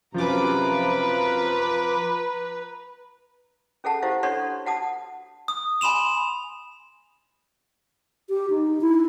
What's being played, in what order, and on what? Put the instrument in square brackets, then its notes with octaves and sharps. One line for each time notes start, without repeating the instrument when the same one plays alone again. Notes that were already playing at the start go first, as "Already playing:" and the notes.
[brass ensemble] F#2 C3 [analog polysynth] F3 F4 D6 [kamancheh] B4 A#5
[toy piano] C#4 G#4 A4 F#5 A5
E4 G4 C5 F5 F#5
D4 A4 C#5 F#5 C6 C#6
F#4 F#5 A5 D#6
[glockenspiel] D#6
G#5 B5 C6 E7 F7
[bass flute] G4
D#4
E4